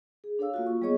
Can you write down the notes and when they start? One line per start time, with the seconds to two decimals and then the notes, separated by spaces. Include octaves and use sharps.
0.24 G#4
0.39 D4 A4 C#5 F5 E6
0.54 A#3 F4 F#4
0.67 C#6
0.82 G3 B3 G#4 C#5 D#5 C#6